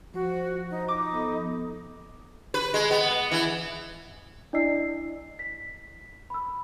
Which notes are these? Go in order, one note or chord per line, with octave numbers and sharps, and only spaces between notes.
F3 F#4 C5
D#4
D#4 D6
B3 A4
B4
G#3
B3
E3
D4 E4 D5 D#5 E6 C7
B6
B5 E6